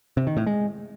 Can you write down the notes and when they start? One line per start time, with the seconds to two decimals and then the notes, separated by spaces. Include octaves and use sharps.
0.17 C3
0.27 D#3
0.37 A2
0.46 G#3